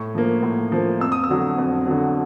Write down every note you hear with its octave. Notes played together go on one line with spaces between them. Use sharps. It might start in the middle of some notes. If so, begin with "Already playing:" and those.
Already playing: A2 C#6
F3 A#3
A2
F3 A#3
F2 E6
D#6
E6
D3 F#3
F2
D3 F#3